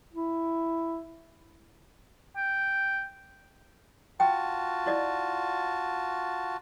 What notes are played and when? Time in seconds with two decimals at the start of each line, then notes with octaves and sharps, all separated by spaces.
0.13 E4
2.36 G5
4.20 F4 F#4 G5 A5
4.86 E4 D5 D#5